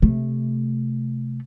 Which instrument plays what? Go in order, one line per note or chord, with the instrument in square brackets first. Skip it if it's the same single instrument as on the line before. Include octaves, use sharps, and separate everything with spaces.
[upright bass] C3 A3